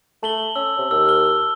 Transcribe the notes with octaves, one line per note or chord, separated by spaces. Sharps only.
A3 A5 F#7 G7
C#4 E6
C3
D#2 E6
F6 G7